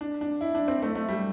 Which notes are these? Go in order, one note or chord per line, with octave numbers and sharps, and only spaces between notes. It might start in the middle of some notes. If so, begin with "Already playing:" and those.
D4
D4
E4
D4
C4
A3
A3
G3